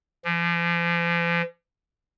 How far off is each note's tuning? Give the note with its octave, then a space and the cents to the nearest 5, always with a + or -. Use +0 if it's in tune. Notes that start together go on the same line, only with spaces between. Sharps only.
F3 -40